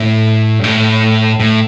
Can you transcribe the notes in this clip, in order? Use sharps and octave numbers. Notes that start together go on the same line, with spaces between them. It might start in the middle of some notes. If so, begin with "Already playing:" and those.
Already playing: A2
G2
A2
A2